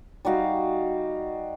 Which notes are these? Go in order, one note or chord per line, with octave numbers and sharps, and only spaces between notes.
G3 D#4 F#4 F5